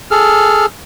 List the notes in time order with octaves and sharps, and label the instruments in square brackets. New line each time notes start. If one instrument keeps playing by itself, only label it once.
[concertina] G#4 A4 F6